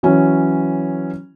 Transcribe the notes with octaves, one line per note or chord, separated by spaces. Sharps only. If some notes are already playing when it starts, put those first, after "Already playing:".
E3 F#3 C#4